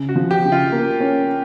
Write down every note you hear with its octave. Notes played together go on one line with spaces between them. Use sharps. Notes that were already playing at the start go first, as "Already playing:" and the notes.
Already playing: C#3
F#4
F3
G4
C#3
F4
A#3
C#4